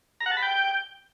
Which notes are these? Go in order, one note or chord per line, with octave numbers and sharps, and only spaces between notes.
A#5
F#5
A5
B5
G5